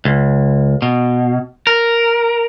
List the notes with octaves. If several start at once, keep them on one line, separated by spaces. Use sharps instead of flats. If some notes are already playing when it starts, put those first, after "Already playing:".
C#2
B2
A#4